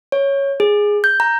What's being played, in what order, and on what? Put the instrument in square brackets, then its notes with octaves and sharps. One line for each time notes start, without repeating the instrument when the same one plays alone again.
[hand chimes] C#5
G#4
G6
A#5